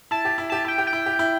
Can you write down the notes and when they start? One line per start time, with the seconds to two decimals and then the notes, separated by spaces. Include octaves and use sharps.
0.11 E4 A5
0.25 G4
0.38 E4
0.49 G4 A5
0.65 E4 G5
0.78 G4
0.87 G5
0.93 E4
1.06 G4
1.19 E4